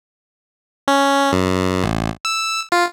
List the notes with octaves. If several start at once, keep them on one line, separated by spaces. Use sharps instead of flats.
C#4
F#2
A1
E6
F4